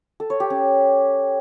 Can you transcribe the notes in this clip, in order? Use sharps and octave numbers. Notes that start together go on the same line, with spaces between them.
A4
C#5
G4
C#4